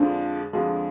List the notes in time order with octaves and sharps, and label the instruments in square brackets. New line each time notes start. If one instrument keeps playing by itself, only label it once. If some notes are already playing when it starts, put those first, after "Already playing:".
Already playing: [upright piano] F2 D3 F3 G#3 [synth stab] D4
[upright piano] F2 D3 F3 G#3